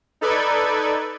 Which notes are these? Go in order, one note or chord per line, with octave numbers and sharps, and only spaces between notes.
D#4 A4 B4 D5 G#6